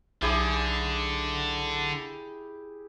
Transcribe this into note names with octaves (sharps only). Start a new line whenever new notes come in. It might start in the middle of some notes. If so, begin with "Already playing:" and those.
B1 D3 E4 G4 G#4